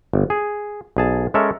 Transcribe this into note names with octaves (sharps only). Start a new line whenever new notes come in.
G1
G#4
B1 G#4 A5
G#3 C#4 A4 A#4 C#5 E5